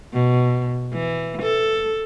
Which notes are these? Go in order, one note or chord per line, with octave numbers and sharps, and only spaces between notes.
B2
E3
A4